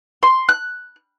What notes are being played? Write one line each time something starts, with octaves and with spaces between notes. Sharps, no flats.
C6
F#6